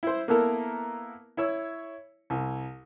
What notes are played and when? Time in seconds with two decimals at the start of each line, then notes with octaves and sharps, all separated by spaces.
0.03 E4 C5
0.28 A#3 B3 E4 A4 A#4
1.37 E4 C#5 E6
2.30 C2